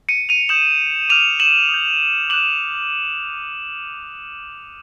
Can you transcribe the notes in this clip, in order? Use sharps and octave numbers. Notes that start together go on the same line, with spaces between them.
C#7 D#7
D#7 F7
D#6 G6 E7 F#7
D6 F6 D#7 F7
E7 F#7
D#6 G6
D6 F#6 E7 F#7